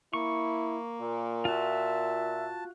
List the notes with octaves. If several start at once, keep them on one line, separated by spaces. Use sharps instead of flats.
A#3 E4 C#6
A#2
F4 F#4 E5 A5